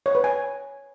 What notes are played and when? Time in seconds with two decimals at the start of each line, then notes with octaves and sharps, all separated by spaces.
0.06 C#5
0.15 B4
0.24 G#5